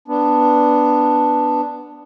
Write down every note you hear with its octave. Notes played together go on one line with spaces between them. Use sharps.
B3 D4